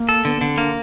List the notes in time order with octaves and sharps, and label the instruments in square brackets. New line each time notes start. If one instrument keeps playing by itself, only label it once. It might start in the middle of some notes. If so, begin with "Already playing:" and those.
Already playing: [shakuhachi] A#3
[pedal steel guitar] A4
[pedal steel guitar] D3 [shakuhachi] B3
[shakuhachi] B3
[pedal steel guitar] D3
[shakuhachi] C4
[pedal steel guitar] A#3 [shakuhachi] D4